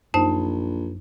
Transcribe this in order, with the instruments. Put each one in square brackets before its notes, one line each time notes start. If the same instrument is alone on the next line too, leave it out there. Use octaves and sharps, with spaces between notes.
[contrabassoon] A#1 [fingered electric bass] F#2 [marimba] D#4 C5 [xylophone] A5